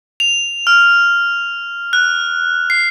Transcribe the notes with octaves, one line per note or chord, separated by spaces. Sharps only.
F7
F6
F#6
C7